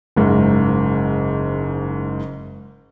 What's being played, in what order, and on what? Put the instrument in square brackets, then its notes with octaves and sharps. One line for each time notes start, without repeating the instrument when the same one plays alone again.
[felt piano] F#1 G#2